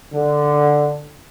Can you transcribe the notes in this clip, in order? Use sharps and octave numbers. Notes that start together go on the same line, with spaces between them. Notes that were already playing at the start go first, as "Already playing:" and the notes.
D3